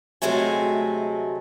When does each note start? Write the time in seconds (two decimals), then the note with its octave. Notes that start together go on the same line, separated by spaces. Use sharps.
0.22 D2 C3 F#3 G#3 A3 G#5